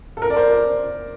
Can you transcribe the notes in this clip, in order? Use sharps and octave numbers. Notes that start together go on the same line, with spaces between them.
A4
A#4
D5
C5
D5